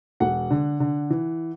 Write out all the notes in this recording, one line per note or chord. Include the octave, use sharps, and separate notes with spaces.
E1 F#5
D3
D3
E3